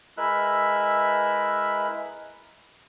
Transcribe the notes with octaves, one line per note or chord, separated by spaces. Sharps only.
G#3 E4 A#4 B4 E5 F#6